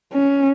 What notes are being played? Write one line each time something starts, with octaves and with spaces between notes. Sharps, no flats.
C#4